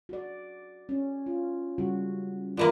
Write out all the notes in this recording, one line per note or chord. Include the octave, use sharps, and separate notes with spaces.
F#4 D5
C#4
F4
C#3 G3 F#4
D3 E3 A#3 F4